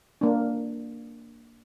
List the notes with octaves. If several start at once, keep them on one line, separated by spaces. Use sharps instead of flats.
A#3 D4